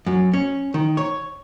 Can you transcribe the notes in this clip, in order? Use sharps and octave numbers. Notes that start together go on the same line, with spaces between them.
F#2
C#4
D#3
C#5